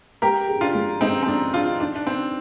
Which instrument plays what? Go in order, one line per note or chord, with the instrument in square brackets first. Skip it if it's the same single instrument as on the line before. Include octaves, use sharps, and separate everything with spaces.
[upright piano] G#3 [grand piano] G4 A#4
[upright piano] G#4
[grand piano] D4 F4
[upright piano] G#3
[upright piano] G#3 [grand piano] C4 D#4
[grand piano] C4
[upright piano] G#3 [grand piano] D4
[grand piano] D4 F4 [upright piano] G#4
[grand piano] D4 [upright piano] D#4
[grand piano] D4
[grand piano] C4 [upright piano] D#4